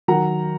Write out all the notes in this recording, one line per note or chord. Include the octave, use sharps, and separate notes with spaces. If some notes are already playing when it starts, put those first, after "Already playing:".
D#3 F#3 F#5 A#5